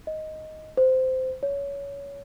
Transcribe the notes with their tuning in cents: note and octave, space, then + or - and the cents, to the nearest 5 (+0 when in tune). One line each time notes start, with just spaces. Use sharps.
D#5 +5
C5 -15
C#5 +20